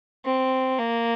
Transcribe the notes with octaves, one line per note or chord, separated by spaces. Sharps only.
C4
A#3